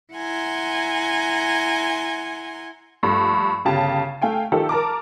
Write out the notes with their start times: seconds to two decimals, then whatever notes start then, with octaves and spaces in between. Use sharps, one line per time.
0.14 E4 F#5 G#5 A#5 C6
3.03 A#1 G2 A3
3.65 G1 C#3 G4 A5
4.22 A3 F5 G5 G#5
4.52 D#3 F3 G4 A4
4.69 A#4 A5 A#5 D6